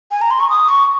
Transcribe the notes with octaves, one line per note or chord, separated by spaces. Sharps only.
G#5
A#5
C6
C#6
D#6
C#6